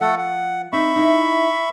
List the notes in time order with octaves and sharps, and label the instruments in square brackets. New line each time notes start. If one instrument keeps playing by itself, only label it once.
[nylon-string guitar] F3 [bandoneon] A3 A4 F#5
[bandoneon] F#5
[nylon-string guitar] C4 D#4 [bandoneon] E5 B5 C#6
[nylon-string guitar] D#4 E4